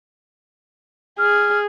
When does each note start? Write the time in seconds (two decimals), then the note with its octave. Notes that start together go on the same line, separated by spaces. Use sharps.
1.19 G#4 F6